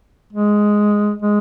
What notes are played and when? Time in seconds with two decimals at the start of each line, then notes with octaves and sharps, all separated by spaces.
0.33 G#3
1.22 G#3